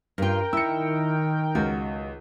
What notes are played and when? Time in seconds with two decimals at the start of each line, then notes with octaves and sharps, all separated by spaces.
0.18 G2 F4 A#4 G5
0.53 D#3 E4 E6 C#7
1.55 C#2 F#4